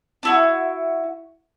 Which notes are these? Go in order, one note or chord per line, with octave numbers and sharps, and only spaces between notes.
D4 E4 F#4